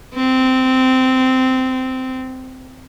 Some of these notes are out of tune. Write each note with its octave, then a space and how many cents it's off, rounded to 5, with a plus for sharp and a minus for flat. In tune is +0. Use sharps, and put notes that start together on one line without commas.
C4 -15